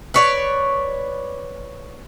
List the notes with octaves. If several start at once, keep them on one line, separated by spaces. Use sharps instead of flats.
B4 C#5 D5